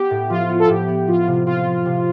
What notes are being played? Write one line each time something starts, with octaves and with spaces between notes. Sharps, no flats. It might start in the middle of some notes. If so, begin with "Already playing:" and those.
Already playing: B3 G4
A2
F3 F4
B3
A4
A2 G4
B3
F3 F4
C3
C4 F4
F3
C3